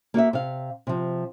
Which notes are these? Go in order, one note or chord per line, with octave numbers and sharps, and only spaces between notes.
A#3 F#4 D#5 E5
C3 F5
C3 F3